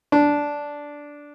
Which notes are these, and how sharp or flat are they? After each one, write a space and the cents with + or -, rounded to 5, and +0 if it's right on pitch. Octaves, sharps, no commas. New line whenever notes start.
D4 -10